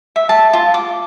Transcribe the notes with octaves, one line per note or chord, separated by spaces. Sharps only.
E5
A5
F4
D6